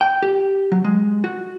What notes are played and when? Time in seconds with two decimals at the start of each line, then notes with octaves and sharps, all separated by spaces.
0.01 G5
0.22 G4
0.72 F#3
0.84 G#3
1.24 F#4